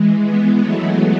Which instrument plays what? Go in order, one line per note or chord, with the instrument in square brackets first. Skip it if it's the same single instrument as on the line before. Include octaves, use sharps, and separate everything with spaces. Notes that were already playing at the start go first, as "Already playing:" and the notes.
Already playing: [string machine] E3 G#3
G#3 B3
F#3 A3